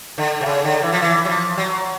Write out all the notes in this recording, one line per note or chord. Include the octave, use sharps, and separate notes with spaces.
D3
C3
C#3
D3
E3
F3
E3
F#3
F3
F#3